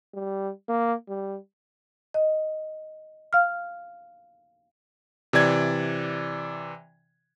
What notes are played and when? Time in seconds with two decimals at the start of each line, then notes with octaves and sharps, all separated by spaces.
0.14 G3
0.69 A#3
1.08 G3
2.14 D#5
3.33 F5 F6
5.33 C3 E3 D5 G#6